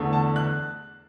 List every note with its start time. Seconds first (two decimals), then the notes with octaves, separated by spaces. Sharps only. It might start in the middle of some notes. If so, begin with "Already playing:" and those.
Already playing: E2 D3 A3
0.13 A5
0.36 F#6